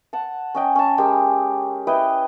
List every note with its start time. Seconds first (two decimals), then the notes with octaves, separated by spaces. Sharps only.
0.13 F#5 A5
0.55 C#4 D#5 G5
0.75 C#4 A5
0.98 G#3 G4 A#4
1.87 E4 B4 D#5 G5